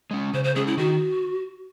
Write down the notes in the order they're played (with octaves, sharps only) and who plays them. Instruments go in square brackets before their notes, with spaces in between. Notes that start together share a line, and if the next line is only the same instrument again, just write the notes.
[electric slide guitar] G#3 C#4
[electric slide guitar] C#3 [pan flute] C5
[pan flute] C5
[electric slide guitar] G#3 C#4 [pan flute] G#4
[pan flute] E4
[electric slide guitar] D#3 [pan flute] F#4